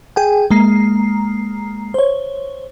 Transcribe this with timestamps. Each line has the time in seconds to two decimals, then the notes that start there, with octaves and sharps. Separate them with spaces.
0.16 G#4 G5 G#5
0.51 G#3 A#3 A#5 C7
1.94 C5 C#5